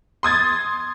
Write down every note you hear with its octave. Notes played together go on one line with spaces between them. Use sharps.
C6 D#6 G#6 A6